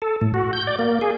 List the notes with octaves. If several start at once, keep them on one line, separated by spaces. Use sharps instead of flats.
A4
A2
F#4
G6
D5
A#3
G#4